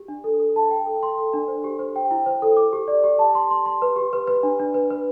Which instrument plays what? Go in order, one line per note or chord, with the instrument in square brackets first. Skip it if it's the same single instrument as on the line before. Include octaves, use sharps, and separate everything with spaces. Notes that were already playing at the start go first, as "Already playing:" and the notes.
Already playing: [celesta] G4
D4
A4
A4
A5
G5
A4
C6
A4
D4
C5
G4
C5
G5
E4
C5
A4
D6
G4
D5
G4
A5
C6
C6
C6
B4
G4
B4
B4
D4
D4
B4
B4